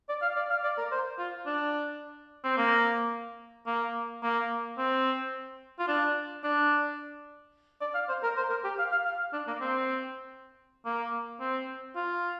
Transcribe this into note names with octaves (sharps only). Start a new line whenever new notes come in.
D5
F5
D5
F5
D5
A#4
C5
F4
D4
C4
A#3
A#3
A#3
C4
F4
D4
D4
D5
F5
C5
A#4
C5
A#4
G4
F5
F5
F5
D4
A#3
C4
A#3
C4
F4